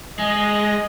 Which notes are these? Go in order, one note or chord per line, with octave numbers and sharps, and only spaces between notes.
G#3 D#5